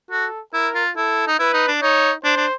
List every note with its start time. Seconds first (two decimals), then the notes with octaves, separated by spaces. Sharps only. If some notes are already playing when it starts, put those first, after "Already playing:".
0.11 F#4 A4
0.53 E4 A#4
0.75 F4
0.96 E4 A4
1.27 D#4
1.39 E4 B4
1.54 D#4
1.68 D4
1.82 D#4 C#5
2.24 D4 C5
2.37 D4